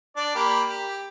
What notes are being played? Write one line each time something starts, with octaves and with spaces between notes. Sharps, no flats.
D4 D5
A#3 G4 B5
G4